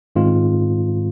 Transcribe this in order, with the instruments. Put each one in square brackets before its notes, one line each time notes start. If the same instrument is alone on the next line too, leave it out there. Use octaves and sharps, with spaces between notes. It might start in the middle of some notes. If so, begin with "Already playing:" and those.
[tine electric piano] G#2 D#3 G#3 C4 F4